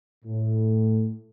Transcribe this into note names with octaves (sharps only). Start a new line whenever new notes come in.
A2